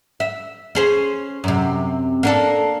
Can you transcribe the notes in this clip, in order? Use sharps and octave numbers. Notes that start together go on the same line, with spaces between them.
E5
C#4 G#4 C5
F#2 C3
A#3 D4 A4